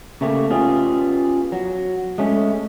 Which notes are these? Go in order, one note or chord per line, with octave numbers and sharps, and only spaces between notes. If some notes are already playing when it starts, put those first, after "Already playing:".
C#3 A3 A#3 G4
B3 C#4 F4 G4 G#4
F#3
G#3 A3 C#4